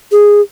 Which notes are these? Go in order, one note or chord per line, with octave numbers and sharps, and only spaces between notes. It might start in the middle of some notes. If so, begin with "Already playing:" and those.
G#4